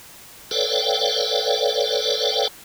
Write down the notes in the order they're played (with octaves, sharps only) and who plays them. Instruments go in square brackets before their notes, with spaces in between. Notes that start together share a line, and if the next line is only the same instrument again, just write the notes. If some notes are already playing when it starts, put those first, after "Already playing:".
[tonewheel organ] A4 B4 C#5 D5 F5 G5